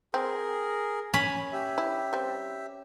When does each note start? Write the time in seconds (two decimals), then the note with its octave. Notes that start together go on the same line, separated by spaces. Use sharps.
0.14 C4 G#4 A#4
1.14 C#4 G#5 B5
1.53 G4 E5
1.78 E4
2.13 G3 C4